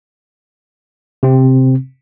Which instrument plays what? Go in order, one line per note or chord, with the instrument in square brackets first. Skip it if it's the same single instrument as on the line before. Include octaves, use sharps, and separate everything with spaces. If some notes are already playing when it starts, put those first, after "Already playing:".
[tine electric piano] C3 C4